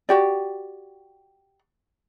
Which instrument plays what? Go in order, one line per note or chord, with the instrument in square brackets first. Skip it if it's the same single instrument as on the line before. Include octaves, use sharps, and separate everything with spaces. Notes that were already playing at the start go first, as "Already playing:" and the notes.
[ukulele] F#4 G4 D5